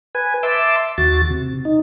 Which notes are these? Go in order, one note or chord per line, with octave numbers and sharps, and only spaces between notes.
B4 G#5
E5 A5 C6 D6 E6
D#2 F#4 A6
C3
D#4